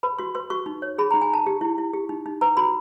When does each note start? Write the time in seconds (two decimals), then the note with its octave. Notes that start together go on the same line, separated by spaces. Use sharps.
0.03 B4 B5
0.18 F#4 C6
0.35 B4 C6
0.50 F#4 C#6
0.66 D#4
0.82 C#5
0.98 G#4 B5
1.11 D#4 A#5
1.22 G#5
1.30 D#4 A5
1.46 G4
1.61 E4
1.78 E4
1.94 G4
2.09 D#4
2.26 D#4
2.41 B4 A#5
2.57 F#4 B5